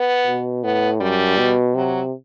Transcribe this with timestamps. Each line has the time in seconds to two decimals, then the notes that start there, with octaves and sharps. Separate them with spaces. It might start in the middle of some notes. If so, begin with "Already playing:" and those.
Already playing: B3
0.27 B2
0.64 A2 B3
1.01 F#2 G3
1.38 B2
1.74 C3 F#3